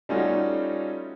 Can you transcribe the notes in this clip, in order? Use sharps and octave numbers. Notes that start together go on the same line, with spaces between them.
G3 A3 C#4 D#4 F4 F#4